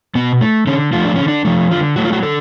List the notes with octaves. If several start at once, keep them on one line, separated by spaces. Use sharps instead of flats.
B2 B3
A3
D3 C#4
F3 A3 F4
D4
D3 C#4
D4
F3 A3
D3 F4
F#3 A3 F#4
F4
F#4
D3 A4